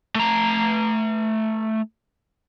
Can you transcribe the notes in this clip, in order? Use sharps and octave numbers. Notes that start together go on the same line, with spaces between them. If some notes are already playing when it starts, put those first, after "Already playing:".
A3 A#5